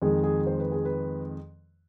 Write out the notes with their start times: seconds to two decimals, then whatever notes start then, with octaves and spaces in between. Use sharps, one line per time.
0.02 F2 D#3 G#3 G#4
0.24 G#4
0.47 C5
0.60 B4
0.72 G#4
0.85 B4